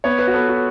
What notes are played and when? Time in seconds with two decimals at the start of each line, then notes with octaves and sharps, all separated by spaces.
0.04 B3 C#5
0.19 B4
0.27 F#4
0.34 B3 A4
0.49 F#4